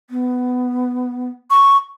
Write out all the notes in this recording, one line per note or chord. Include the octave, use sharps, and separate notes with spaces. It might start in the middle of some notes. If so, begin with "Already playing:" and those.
B3
C#6